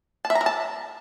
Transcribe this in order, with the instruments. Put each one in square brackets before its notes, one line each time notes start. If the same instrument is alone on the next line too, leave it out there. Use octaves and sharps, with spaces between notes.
[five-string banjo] A5
E5
A#5
A#4
A5